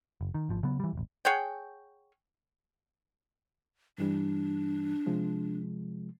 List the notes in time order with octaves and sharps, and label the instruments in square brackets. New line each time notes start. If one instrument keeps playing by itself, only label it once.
[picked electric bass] F#1
D#3
G#1 F3
C#3 F#3 B3
E3 G3
E1 A1
[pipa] G#4 C#5 F#5 G5
[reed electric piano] G2 E3 G3 [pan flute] D4
[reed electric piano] C3 F3 G#3